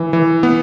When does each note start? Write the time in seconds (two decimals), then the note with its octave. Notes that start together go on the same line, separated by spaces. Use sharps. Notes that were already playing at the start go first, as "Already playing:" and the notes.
Already playing: E3
0.13 E3
0.43 B3